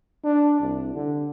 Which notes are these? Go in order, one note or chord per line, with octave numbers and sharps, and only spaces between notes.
D4
C2
D3